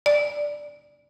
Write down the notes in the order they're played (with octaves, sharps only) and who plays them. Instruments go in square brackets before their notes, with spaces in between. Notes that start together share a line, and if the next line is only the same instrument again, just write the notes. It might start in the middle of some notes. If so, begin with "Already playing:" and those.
[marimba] D5